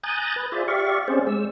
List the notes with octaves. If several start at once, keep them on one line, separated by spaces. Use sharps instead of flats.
G#5 A#5 D#6 F#6 G6 A6
B4
F4 G#4 C5 D5 E5
G4 D5 E5 F5 C#6
C4 C#4 G#4 C5 D5
G#3 E6